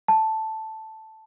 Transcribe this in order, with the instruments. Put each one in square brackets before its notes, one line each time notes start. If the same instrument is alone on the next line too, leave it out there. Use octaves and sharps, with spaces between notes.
[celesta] A5